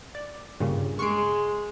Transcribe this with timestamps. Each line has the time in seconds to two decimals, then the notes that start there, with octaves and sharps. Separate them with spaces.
0.15 D5
0.60 G2 A#2 C#3
0.99 G#3 C#6 C7 D7